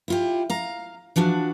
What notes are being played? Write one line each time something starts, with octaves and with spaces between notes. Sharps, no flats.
E4 F4 G4
F5 A#5
E3 F3 D4 F#4